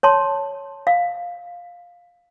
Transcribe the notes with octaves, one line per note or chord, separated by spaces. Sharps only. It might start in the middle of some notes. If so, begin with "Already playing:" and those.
C#5 A5 C6
F5